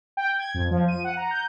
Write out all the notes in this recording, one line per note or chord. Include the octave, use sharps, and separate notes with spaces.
G5
G#6
F2
F3
D#7
F#5
A#5
G6